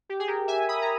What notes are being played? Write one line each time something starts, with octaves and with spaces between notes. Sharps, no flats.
G4
G#4
G4 A#4
E5 G#5
B5 D#6
A#5